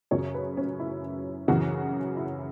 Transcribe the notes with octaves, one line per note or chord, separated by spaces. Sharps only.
F#2 C#3 F#3 C#5
B4
C#4
E4
F#2 C#3 E3 F#4
E4